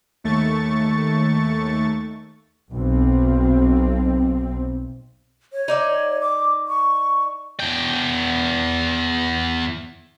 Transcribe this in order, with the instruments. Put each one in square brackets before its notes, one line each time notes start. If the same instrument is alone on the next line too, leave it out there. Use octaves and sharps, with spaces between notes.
[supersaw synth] D#2 A3 C#6 A6
[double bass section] B1 C4
[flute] C#5
[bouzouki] D#4 D5 E5
[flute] D6
C#6
[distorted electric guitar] E2 G5